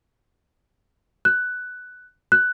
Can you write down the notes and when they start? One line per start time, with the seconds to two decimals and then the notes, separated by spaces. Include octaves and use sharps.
1.25 F#6
2.32 F#6